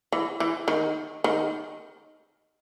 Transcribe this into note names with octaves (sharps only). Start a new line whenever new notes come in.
E3
E3
D#3
D#3